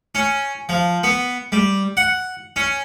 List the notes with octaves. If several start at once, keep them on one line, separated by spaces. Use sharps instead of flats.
C#4
F3
B3
G3
F#5
C#4